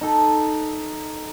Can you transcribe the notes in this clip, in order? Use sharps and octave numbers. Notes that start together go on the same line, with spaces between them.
D#4 A4